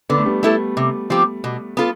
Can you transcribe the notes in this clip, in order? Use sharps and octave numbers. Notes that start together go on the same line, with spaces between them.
D3 B3
A3
G3 B3
A3 E4 A4
C3
F3 C4 G4
B2
B3 F4 A4